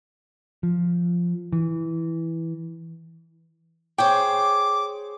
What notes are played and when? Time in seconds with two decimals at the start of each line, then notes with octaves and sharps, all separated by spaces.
0.63 F3
1.53 E3
3.98 G#4 C5 C#5 G5 D6